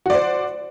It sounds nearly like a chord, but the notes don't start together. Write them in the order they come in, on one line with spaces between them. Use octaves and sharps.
F#4 D5 C5